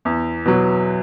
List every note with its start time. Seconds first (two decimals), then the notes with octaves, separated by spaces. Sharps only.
0.05 E2
0.45 B2 F#3